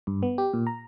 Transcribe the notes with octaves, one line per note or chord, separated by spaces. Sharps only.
G2
B3
G4
A#2
A#5